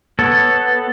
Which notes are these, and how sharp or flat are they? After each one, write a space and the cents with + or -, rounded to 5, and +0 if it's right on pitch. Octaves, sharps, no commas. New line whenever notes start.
B3 +0 A4 +0 C#5 -5